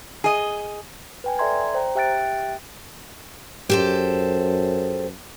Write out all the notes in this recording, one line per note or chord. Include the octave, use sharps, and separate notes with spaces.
G#4 D#5
B4 G5 G#5
A4 D5 E5 A#5 C6 G#6
C5 G5 A#5
G4 E5 G5 F#6 A6 D7
F#2 G4 A4 C5